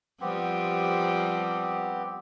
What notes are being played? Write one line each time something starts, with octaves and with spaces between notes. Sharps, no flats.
F3 G3 B3 C4 G4